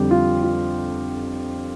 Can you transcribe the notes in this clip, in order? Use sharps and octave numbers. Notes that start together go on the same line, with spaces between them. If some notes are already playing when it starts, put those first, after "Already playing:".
Already playing: F2 D3 G3 G4
F4
F4